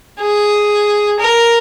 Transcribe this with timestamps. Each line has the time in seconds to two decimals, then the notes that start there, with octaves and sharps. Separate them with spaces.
0.21 G#4
1.20 A#4